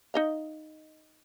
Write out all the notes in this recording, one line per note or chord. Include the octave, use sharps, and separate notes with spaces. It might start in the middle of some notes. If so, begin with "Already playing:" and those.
D#4 D#5 F5